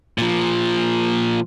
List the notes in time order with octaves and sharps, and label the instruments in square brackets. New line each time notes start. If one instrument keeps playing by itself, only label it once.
[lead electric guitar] A#2 F3